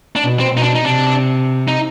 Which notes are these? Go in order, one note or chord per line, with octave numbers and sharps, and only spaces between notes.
D4
B2
C4
B2 D#4
D4
D#4
C3 D4
D#4